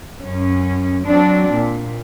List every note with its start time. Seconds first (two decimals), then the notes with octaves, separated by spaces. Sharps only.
0.19 F#2 C#4
1.06 F#3 C4 D4
1.54 A#2